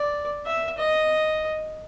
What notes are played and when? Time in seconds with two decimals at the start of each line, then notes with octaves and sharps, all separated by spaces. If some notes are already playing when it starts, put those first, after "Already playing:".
Already playing: D5
0.45 E5
0.78 D#5